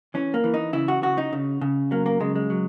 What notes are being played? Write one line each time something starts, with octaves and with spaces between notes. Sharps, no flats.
E3 C#4
A#3
E3
D#4
C#3 E4
F#4
C#3 F#4
D#4
C#3
C#3
F#3 A#3
A#3
C#3 G#3
G#3
F#3